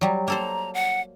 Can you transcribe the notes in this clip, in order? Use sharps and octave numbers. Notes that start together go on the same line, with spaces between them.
F#3 G3
A#3 A4 C5 A#5
F#5